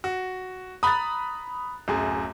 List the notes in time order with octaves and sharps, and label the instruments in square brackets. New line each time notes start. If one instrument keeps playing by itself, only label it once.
[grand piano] F#4
[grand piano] A#5 F#6 A6 [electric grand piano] B5 D#6
[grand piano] D1 F#2 G#4